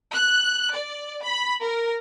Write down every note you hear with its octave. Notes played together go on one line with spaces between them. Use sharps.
F#6
D5
B5
A#4